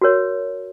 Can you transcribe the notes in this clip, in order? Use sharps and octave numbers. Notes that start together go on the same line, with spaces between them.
F#4 A#4 C#5